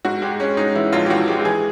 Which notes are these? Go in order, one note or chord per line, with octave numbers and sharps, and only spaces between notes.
G#2 F#4
G#3 G4
G#3 C#4
G#3 D#4
E3 E4
A#1 F4
G4
E3 F#4
G#3 G4
G4
E3 G#4